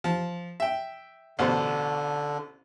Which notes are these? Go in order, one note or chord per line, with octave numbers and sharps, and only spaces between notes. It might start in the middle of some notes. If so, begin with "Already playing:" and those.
F3
E5 G5
A1 B2 D3 C5